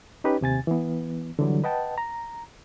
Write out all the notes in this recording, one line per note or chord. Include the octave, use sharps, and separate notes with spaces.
C#4 D#4 G4 B4
D#2 C3 G#5 A6
E3 B3
D3 E3 F#3 G3
B4 D#5 F#5 G5 A5
A#5